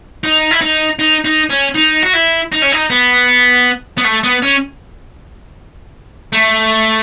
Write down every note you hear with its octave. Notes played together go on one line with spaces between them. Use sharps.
D#4
E4
D#4
D#4
D#4
C#4
D#4
F#4
E4
D#4
C#4
D#4
B3
B3
A3
B3
C#4
A3